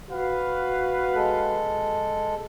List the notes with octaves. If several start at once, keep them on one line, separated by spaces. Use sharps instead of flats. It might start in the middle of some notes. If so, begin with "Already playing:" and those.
F#4 B4 F5
G#3 A4